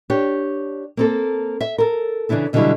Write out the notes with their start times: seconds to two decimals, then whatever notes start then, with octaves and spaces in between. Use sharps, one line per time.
0.10 D4 G4 C#5
0.97 A#3 C4 A4
1.61 E5
1.78 A4 A#4
2.29 C#3 E3 D4 E4 A4
2.53 B2 D3 E3 F#3 G3 E4